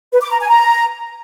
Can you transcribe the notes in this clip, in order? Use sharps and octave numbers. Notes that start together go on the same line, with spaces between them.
B4
D6
A#5
G#5
A#5